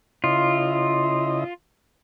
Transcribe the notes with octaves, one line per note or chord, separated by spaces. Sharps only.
C#3 E4 F4 D#5